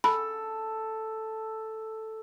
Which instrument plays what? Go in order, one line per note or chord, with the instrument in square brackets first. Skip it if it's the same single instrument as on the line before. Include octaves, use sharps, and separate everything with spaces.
[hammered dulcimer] A4 [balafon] B5